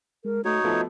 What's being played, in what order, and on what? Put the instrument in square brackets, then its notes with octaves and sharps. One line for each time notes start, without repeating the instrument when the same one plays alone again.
[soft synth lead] G#3 [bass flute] A#4
[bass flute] A3 [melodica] D#4 C#5 [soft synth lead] F#4
[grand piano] F3 A3 B3 [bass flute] D#5